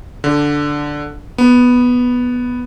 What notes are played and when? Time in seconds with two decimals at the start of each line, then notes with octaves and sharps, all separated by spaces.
0.24 D3
1.38 B3